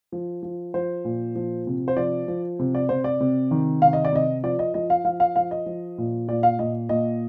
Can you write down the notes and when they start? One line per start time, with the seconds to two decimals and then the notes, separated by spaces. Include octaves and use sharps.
0.12 F3
0.43 F3
0.74 F3 C5
1.05 A#2
1.36 F3
1.67 C3
1.88 C5
1.97 F3 D5
2.28 F3
2.59 C3
2.75 D5
2.89 C3 C5
3.04 D5
3.20 C3
3.51 D#3
3.82 C3 F5
3.93 D#5
4.05 D5
4.12 C3 D#5
4.43 F3 D5
4.59 D#5
4.74 F3 D#5
4.90 F5
5.05 F3 F5
5.20 F5
5.36 F3 F5
5.51 D#5
5.66 F3
5.98 A#2
6.28 A#2 D5
6.43 F5
6.59 A#2 D#5
6.89 A#2 D#5